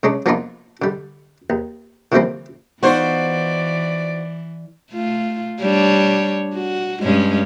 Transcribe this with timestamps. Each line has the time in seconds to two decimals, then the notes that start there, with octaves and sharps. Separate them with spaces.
0.03 C#3 G#3 C#4 D4
0.26 F3 A#3 B3 D4 D#4 F4
0.82 D3 G3
1.50 D#2
2.12 D3 E3 F3 G3 A#3 C4
2.83 E3 B3 D#4 F4 F#4 C5 D5
4.92 A3 F4
5.60 G3 D4 C#5
6.55 F#4
7.02 G2 G#3 C#4